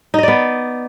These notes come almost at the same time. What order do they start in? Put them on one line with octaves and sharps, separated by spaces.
D#4 D#5 D5 B3